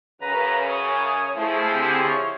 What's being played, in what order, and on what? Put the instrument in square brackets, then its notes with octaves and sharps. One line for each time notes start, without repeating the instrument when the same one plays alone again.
[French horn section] F#2 C#3 [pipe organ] B4 A#5
[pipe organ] C#5 G#5 D#6
[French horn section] F3 E4 G#4 [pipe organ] A3
[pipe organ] D3 C4 G4
C#5